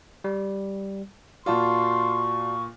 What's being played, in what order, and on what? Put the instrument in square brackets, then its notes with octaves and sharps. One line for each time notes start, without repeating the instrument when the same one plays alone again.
[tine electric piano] G3
[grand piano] A#2 F4 [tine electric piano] F#4 D5 A5 [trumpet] C6 [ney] C#6